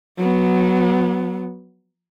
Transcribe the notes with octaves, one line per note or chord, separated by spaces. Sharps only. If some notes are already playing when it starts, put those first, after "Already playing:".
F#3 B3